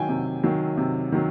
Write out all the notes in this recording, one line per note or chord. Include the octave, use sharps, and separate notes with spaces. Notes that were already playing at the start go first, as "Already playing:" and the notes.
Already playing: D#3 F#3 G5 G#5
C3
D#3 F#3
C3
D#3 F#3